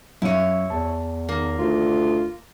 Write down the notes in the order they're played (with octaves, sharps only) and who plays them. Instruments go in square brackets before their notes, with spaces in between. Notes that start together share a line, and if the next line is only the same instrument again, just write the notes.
[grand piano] F#2 F5 D#7 [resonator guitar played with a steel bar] E4 C#5
[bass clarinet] E2 [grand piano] A5
[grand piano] D#3 [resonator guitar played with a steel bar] A#3
[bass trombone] D2 [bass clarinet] F4